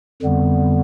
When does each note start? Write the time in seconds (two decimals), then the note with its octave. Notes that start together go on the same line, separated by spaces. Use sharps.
0.22 F2 D3 G3 B3